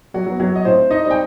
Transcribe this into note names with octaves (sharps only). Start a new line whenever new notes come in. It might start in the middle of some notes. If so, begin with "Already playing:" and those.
F#3 F#4
F#3 B3
F#3 F#4
D#5
A2 C4 C5
D#4 D#5
G3 C4
G5